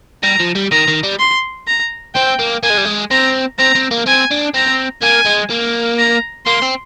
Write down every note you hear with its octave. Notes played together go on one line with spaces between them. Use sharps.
G3 A#5
F3
G3
D#3 A#5
D#3
G3
C6
A#5
C4 G5
A#3
A#3 G#5
G#3
G3
G#3
C4 A#5
C4 A#5
C4
A#3
C4 G#5
D4
C4 A#5
A#3 G#5
G#3
A#3
A#5
A#3 C6
C4